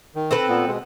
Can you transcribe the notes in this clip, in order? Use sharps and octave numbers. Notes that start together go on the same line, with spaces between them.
D#3
C4 A4 B4
A#2 B3
B2 G#3